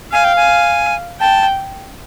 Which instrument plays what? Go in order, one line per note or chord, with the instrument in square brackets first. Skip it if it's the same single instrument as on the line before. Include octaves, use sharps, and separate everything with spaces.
[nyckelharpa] F5 [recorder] G#5
[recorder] G5
G#5
[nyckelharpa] G5 [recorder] A5